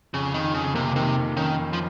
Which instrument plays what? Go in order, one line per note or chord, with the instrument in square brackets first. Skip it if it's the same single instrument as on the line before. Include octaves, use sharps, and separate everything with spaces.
[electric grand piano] F2 [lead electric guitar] C#3
[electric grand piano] F2 [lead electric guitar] D#3
[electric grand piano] F2 [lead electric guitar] C#3
[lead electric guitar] C3 [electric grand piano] A#3
[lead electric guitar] C3 [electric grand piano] D#3
[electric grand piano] F2
[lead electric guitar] D#3 [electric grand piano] C#4
[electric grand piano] F2
[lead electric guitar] F3